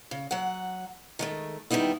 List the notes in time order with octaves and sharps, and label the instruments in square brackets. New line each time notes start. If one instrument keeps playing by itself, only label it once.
[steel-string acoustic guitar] C#3
F#3 F#5
D#3 G#3 A3
D#3 G3 B3 D#4 E4